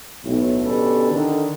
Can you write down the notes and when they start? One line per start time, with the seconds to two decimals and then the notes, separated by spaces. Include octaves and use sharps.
0.24 B1 A2
0.65 B2 D3 C#4 G4 A4 B4
1.11 D3 D#3